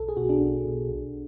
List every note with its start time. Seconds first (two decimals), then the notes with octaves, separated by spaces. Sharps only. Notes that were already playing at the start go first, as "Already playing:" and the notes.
Already playing: B1 A4
0.09 G#4
0.17 B2 F#4
0.29 D4
0.41 B1
0.65 B2
0.89 B1